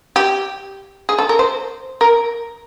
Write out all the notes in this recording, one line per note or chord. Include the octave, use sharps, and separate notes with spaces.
G4
G#4
A4
A#4
C5
A#4